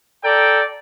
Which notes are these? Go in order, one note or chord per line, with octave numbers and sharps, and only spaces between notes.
A4 D5 G5 A#5